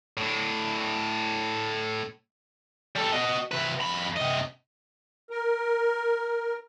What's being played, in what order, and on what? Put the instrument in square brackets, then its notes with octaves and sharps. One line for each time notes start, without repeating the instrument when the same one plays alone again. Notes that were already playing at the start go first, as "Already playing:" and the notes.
[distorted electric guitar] A2 D4
G3 A4
F#4 D#5
C3 B4
F2 B5
C3 D#5
[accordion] A#4